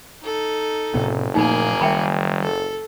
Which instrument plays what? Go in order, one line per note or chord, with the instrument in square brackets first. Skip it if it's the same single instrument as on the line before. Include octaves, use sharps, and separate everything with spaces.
[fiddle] D#4 A4
[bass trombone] F#1 [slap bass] A2 C3 B3 [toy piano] C#4
[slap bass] A#2 F3 A3 [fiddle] A#3 G#4 [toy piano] D#4 B5
[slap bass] D#3 G3 [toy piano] E5 G5 B5
[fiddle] A4